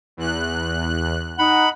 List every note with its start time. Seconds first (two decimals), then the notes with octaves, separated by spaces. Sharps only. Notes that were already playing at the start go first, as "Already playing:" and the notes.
0.17 E2 F#6
1.39 D#4 F#5 B5